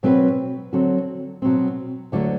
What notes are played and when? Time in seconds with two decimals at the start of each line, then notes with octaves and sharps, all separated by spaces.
0.03 B2 F#3 C4 F#4 B4
0.73 D3 F#3 C4 F#4
1.42 B2 F#3 C4
2.12 D2 D3 F#3 A3